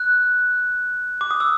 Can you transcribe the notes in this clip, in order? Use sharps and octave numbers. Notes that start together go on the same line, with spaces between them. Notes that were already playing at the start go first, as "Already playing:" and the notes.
Already playing: F#6
D6
D#6
E6